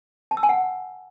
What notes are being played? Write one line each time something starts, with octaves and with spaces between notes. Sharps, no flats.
A5
E6
G#5
F#5